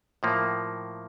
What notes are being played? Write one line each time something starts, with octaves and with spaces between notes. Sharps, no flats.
A2 F3 A#3